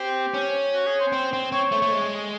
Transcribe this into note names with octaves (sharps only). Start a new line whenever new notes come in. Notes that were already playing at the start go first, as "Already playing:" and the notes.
Already playing: C4 G4
C#4
F#4
G#4
C5
C4
C4
C4 C#5
A3
A3
G#3